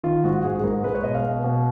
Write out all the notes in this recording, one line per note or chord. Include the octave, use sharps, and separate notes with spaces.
D#3 F4
G#2 F#4
G#2 G#4
G#4
G#2 A#4
G#3 B4
C#5
B2 D#5
F5
B2
B2